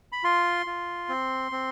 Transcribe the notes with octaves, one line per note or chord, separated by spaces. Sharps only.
B5
F4 C6
F4
C4
C4